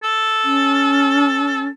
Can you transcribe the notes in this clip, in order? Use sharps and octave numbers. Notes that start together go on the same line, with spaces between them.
A4
C#4